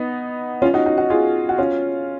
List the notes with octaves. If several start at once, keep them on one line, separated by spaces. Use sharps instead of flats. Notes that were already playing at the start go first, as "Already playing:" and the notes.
Already playing: B3 D#4
C#4 F4
D#4 F#4
D#4 F#4
D#4 F#4
F4 G#4
F#4
C#4 F4